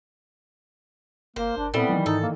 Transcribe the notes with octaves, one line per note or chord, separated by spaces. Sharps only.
G1 A#3 A#4 C5
G1 D4
A#2 G3 B3 C4 E4 A4
D#3 E3 F#3
G#2 D#4 A4
A#3